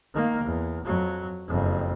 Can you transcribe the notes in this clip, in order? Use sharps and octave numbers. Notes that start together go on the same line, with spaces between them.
D#3 A#3
E2
F2 F#3
F#1 F2